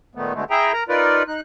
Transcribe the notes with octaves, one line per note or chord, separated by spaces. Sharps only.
A#2 D#3 A3 B3
B2 D3 G#3 A3
E4 G#4 E5 G5 A#5
A#4 A#5
D#4 F4 A#4 B4 D5
D#4 F#6